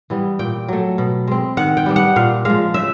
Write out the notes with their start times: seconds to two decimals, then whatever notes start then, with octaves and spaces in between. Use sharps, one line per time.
0.10 E3 G3 B3
0.39 A#2 G5
0.68 F#3 A3
0.98 B2
1.27 G#3 C4
1.57 D#3 F#5
1.77 G5
1.86 G3 B3 D4
1.96 F#5
2.16 A#2 F5
2.45 F3 G#3 F5
2.74 C#3 E5